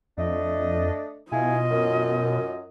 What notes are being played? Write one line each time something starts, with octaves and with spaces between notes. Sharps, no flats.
F2 A3 D4 D#5
B2 E4 F4 D#5 F5 G#5
F#2